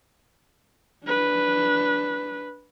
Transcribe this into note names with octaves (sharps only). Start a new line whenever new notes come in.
D4 B4